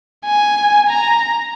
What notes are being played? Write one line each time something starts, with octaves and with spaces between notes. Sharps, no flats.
G#5
A#5